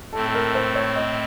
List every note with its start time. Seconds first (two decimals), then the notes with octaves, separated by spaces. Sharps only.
0.13 A2 A3 C4 A4
0.27 A4
0.34 A#4
0.55 C5
0.75 C#5
0.96 D#5